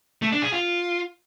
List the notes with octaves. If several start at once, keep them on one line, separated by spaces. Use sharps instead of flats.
A3
D4
G#4
F4